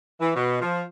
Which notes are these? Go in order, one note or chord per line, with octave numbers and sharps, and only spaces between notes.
E3
B2
F3